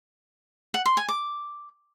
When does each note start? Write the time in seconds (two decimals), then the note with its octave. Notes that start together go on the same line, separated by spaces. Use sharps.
0.74 F#5
0.86 C6
0.97 G#5
1.09 D6